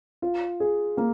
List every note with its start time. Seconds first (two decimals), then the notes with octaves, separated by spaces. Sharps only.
0.22 F4
0.60 G#4
0.97 A#3